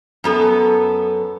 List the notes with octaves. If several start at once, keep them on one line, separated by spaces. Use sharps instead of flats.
F#2 B3 A4